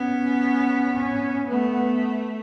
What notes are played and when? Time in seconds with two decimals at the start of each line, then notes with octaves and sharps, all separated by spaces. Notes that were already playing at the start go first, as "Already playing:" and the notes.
Already playing: B3 C#4
0.96 C#4
1.49 A3 B3